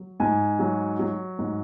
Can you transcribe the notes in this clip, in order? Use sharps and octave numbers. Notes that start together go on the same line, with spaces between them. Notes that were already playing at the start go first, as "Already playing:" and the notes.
Already playing: F#3
G#2 G#5
F#3
F#3
G#2